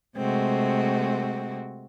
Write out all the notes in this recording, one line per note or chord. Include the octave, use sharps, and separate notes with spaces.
C3 G#3 A3 C4 F#4